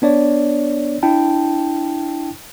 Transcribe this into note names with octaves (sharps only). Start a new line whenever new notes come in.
B3 D4 C#5 D5
D4 E4 G5 A5